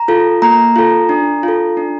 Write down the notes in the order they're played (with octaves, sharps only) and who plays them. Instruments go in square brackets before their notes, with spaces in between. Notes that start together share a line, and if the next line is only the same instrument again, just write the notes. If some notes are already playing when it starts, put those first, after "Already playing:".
Already playing: [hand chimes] A#5
F4 A4
A#3 A#5
F4 A4
D4
F4 A4
D4